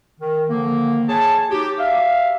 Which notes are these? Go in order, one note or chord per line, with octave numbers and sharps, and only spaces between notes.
D#3
D3 D#3 F3 A#3
G#4 C#5 G#5 A5
D#4 F#4 G4
E5 F5